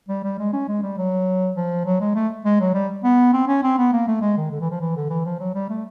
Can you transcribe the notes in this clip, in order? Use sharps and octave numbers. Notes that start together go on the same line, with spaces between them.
G3
G3
G#3
C#4
G#3
G3
F#3
F3
F#3
G#3
A3
G#3
F#3
G3
B3
C4
C#4
C4
B3
A#3
A3
G#3
D#3
D3
E3
F3
E3
D3
E3
F3
F#3
G3
A3